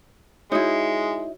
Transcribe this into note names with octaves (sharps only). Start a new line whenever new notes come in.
G#3 D#4 E4 F#4 C#5